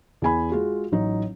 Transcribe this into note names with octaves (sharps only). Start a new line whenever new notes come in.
E2 G#4 G#5 B5
G#3 F4 F#4 G#4
A1 F#3 D#4